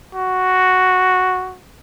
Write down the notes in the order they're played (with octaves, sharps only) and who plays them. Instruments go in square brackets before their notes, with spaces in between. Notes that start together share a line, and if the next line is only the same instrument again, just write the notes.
[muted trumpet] F#4